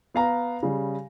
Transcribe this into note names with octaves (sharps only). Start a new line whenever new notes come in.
B3 F5 A#5
C#3 G3